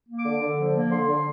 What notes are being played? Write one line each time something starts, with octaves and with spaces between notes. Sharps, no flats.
A#3
D6
D3
D3
F3
A#3
D3 C6
D3